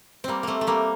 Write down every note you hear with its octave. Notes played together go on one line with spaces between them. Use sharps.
G3 A#3 C4
A3 A#3 C4
A3
G3 A#3